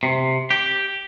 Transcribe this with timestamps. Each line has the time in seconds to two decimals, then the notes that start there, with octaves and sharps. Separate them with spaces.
0.03 C3
0.51 G4